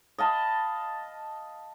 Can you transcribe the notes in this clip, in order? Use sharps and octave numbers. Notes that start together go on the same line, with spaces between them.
D#5 F5 A5 B5